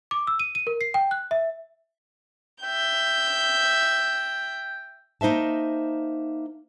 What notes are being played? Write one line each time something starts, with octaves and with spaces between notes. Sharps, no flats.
D6
E6
D#7
D#7
A#4
C7
G5
F#6
E5
E5 G5 G6
A#3 D#4 C5 E5 A5